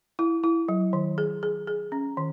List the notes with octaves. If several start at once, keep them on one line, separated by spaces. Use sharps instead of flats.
E4
E4
F#3
D#3
G#4
G#4
G#4
C#4
D#3